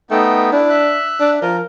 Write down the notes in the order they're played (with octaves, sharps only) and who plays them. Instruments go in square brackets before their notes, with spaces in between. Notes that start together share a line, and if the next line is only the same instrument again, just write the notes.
[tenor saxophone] A3 [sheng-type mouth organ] B3 D#4 G5
[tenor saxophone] D4 [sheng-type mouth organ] E4
[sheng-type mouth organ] E5 F#6
[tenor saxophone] D4
[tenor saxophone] F3 [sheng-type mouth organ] A#4